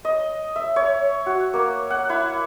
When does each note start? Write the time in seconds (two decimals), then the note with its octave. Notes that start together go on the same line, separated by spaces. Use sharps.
0.05 D#5
0.56 E5
0.76 C#5
1.26 F#4
1.53 A#3
1.90 F#5
2.09 E4